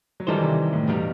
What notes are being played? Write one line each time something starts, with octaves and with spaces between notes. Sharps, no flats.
F#3
D#3 E3 G3 D#4 A4 C5
C3
A2
E2 G2 B2 G3 D#4